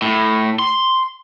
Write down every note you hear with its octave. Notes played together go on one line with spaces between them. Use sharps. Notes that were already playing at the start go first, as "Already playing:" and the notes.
A2
C6